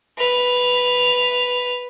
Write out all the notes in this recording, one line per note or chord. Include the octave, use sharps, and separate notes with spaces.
B4 F7